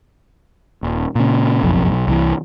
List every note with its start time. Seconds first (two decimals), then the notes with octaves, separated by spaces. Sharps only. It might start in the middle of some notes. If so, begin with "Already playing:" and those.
0.83 D#1
1.15 A#2 C#3
1.63 F#1 B1 F2
1.89 B1
2.07 C2 D#3 E3